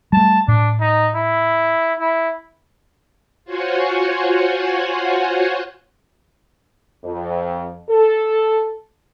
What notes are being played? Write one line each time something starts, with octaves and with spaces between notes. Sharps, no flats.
G3 A3 A5
A2 D4
D#4
E4
E4
F4 F#4 C5 C#5 F#5 G#5
F2
A4